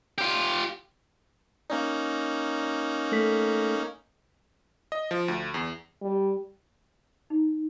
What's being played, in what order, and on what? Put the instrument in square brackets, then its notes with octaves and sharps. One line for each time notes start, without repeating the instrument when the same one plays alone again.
[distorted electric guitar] F4 G4
[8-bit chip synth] A#3 C#4 D#4 [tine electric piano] D5
[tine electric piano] A3 A4 B6
[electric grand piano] D#5
F3
D2
E2
[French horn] G3
[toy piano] D#4